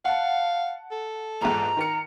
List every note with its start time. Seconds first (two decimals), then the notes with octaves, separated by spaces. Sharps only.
0.05 F5 F#5 A5
0.91 A4
1.41 A#1 E2 G#2 A#5
1.76 D#3 A#4 C#7